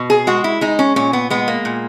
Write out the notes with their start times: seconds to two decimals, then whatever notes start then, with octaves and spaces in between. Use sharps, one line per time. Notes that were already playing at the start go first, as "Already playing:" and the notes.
Already playing: B2
0.10 G#4
0.27 G#3 F#4
0.44 E4
0.61 G#3 D#4
0.79 C#4
0.96 A#2 C#4
1.13 B3
1.30 G#3 B3
1.48 A#3
1.65 A#2